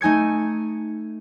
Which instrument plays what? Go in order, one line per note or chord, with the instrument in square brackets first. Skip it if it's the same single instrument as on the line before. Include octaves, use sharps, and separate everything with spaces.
[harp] A3 D#4 G#5 G#6 C#7